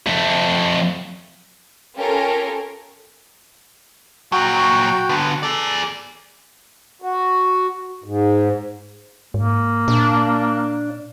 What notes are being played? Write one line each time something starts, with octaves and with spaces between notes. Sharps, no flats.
F2 A3
C#4 F4 G4 A4 A#4
A#2 F#3 F#4 G5
D3 B3
G#4 A4 D5
F#4
G#2
G#2 A#3
A#2 D4